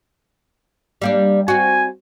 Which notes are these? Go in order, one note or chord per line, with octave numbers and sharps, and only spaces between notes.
G3 A#3 D4
C4 F#4 G#5